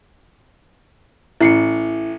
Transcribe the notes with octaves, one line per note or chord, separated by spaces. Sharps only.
A1 E4 C7 C#7